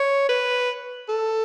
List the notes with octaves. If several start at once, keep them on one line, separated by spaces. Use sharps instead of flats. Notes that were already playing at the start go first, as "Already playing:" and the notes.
Already playing: C#5
B4
A4